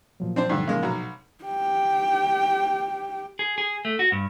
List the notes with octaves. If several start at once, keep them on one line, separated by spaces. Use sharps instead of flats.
A#2 F3 F#3
C4 D4 C5
G2 D3
C#3 G#3 A#3
B1 F#4 A#5
G4 G5
G#4
G#4
A3
F#4
G2